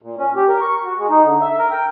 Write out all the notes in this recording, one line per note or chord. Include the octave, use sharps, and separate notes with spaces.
A#2
C#4
G4
A#4
C#6
F#4
G#3
D#4
D3
E5
A#4
G5